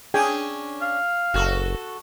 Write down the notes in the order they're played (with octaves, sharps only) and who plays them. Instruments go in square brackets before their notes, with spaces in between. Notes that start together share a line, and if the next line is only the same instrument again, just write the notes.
[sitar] C#4 D4 [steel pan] G#4 G5 G#5
[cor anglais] F5
[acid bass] F#1 [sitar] F#4 A4